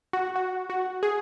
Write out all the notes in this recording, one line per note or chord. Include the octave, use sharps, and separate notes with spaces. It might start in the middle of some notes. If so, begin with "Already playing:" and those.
F#4
F#4
F#4
G#4